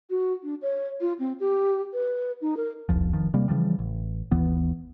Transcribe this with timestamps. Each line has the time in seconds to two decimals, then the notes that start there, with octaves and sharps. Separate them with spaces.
0.10 F#4
0.44 D4
0.62 C#5
1.01 F4
1.19 C4
1.40 G4
1.93 B4
2.41 D#4
2.57 A#4
2.89 D1 B1 E2 F3
3.13 F1 D#3 F3
3.34 C3 G3 A#3
3.48 C#3 E3 F3 G3
3.79 A1
4.31 G#1 D#2 E3 B3